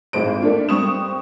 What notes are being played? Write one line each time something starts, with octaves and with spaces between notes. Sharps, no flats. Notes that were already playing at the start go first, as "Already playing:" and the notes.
G#1 A2 G#3 C5 D7
A3 A#3 D4 F4
G2 C4 C#6 D#6 E7